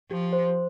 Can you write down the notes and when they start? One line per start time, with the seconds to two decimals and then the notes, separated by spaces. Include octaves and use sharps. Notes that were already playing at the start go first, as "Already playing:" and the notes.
0.10 F3 G4
0.33 C5